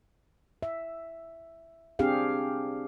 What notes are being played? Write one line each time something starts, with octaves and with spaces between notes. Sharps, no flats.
E5
C4 D4 G4 G#4 F5